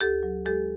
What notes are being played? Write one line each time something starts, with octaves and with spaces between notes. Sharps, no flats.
D2 G4 A4
F#3
G#3 G4 A4